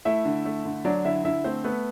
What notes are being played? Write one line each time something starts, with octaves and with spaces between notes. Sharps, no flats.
A3 E4 E5
D3
A3
D3
F#3 D4 D5
D3 E4 E5
D3 E4 E5
A3 C4 C5
A3 B3 B4